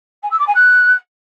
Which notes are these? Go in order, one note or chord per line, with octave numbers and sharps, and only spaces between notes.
G#5
E6
D6
G#5
F#6